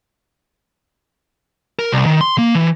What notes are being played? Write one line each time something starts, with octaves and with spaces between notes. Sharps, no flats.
A#4
C2
D#3
C6
A#3
E3